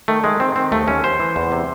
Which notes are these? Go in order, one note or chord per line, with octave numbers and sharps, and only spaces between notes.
D#3 A3
D#3 G#3
D#3 C4
D#3 C4
D#2 A3
D#2 C#4
D#2 C5
E3
E2
C3